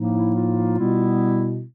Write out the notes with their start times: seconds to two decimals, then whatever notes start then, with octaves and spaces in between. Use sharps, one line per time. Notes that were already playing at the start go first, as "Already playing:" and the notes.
Already playing: A2 F3 A#3 D#4
0.14 E4
0.34 F4
0.77 B2 G3 B3 E4